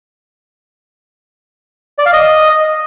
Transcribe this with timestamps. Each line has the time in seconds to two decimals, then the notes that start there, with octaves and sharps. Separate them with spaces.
1.99 D5
2.06 F5
2.13 D#5